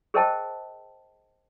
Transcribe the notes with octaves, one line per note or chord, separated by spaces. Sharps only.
G#4 A#4 C5 D#5 G5 A5